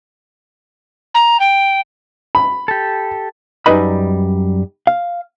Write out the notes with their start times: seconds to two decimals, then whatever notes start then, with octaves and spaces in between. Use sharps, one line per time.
1.14 A#5
1.40 G5
2.35 B5
2.68 G4 A4
3.66 F#2 G3 D#4 B4 D#5 B5
4.87 F5